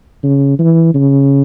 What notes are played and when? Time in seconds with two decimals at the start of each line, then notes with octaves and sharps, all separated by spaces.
0.24 C#3
0.59 E3
0.94 C#3